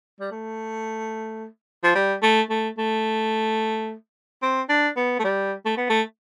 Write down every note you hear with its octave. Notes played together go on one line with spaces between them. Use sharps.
G3
A3
F3
G3
A3
A3
A3
C4
D4
B3
A3
G3
A3
B3
A3